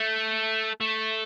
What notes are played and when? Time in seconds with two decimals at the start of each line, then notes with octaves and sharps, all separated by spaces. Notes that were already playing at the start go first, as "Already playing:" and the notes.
Already playing: A3
0.81 A3